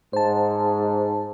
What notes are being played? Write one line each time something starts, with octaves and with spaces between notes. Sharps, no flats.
G#2 C5 A5